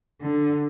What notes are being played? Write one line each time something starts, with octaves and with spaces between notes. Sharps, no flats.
D3